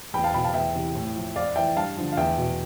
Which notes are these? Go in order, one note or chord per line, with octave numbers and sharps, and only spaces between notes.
E2 G5 B5
F5 A5
B2 G5 B5
F5 A5
E2 E5 G5
C3 E3
A2
F3
F2 D5 F5
E3 E5 G5
G2 F5 A5
D3 F3
F5
E2 E5 G5
B2